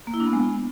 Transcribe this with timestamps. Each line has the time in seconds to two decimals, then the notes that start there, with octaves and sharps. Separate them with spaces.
0.07 A#3
0.14 E4
0.20 D4
0.27 B3
0.33 G#3